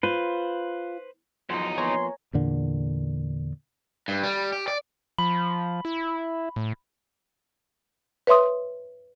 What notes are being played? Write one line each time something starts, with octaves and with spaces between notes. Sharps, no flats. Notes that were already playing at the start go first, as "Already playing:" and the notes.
F4 B4 C5
E2 F3 F#3 D#4 C6
F3 A#3 B3 C#5 G#5 A#5 C6
E2 A#2 D3
G2
G3
G4
D5
F3 B5
E4
A2
B4 C#5 E5 C6 D#6